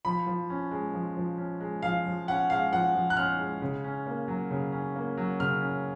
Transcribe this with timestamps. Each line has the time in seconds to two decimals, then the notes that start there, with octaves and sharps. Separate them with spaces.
0.05 F3 B5
0.27 F3
0.50 C#4
0.71 G#3
0.93 F3
1.17 F3
1.38 C#4
1.60 G#3
1.82 F3 F5
2.06 F3
2.28 C#4 F#5
2.50 G#3 F5
2.72 F3 F#5
2.95 F3
3.10 F#6
3.17 C#4 F6
3.39 G#3
3.62 C#3
3.84 C#4
4.07 A#3
4.28 F#3
4.51 C#3
4.72 C#4
4.96 A#3
5.18 F#3
5.40 C#3 F6
5.61 C#4